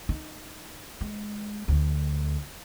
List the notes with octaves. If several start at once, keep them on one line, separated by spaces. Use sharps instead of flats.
D#4
G#3
D2 D4